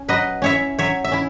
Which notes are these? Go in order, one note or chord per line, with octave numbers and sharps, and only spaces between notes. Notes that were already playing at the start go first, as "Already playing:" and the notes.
Already playing: C#4
F#3 B4 D#5
C#4 E4 C#5 E5
F#3 C#5 E5
E5
C#4 E4